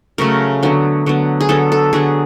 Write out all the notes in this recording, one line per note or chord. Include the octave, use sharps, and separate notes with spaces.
C#3 F#3 A3 A#4
D3 F#3 B3
D3 F#3 B3
G#4
D3 F#3 B3 A4
A4
D3 F#3 B3 G#4